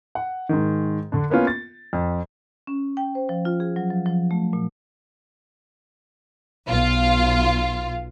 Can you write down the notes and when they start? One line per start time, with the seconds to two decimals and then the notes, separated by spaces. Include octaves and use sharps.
0.15 F#5
0.49 G#2 D#3
1.12 D3 D4
1.30 A#3 B3 C#4 F4
1.47 A6
1.93 F2
2.67 C#4
2.97 G5
3.15 C5
3.29 F3
3.45 F4
3.60 G#4
3.76 F#3
3.91 F3
4.06 F3
4.31 A3
4.53 A#2
6.67 B1 F4 F5